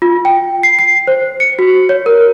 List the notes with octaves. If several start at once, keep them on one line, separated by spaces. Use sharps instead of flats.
F4
G5
C7
C7
C5
C#7
F#4
C#5
A#4